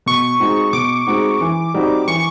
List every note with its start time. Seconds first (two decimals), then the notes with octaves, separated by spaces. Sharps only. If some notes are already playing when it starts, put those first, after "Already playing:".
0.06 B2 C#6
0.40 G#3 C4 D#4 F#4
0.73 B2 D6
1.07 G#3 C4 D#4 F#4
1.41 E3
1.74 G3 C4 D#4 F#4
2.08 E3 C#6